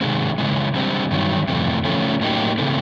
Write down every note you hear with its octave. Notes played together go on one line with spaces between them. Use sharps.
C3 D#3 G#3 C4
C#3 E3 G#3
D3 G3 C4
G2 D#3 F#3
F2 C3 E3 A3
C#3 F3 A3 C#4
A2 F#3 A#3 D#4 G4
C#3 E3 A3 C4